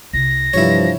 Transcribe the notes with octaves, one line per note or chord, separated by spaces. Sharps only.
C2 C3 A#6
G2 C3 E3 F3 E4 C#5